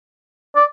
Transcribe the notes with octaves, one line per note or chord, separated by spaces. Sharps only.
D5